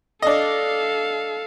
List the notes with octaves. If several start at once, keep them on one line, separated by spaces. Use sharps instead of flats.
D4 A4 D#5 F5